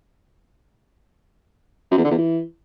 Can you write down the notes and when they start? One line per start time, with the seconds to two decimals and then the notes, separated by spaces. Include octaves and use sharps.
1.91 F#2
1.98 E2
2.05 D3
2.11 E2
2.18 E3